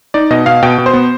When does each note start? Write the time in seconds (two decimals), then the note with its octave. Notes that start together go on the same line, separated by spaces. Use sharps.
0.14 D#4 D5
0.30 B2 D#5
0.46 B2 F5
0.62 B2 G5
0.78 B2
0.86 C5
0.93 B3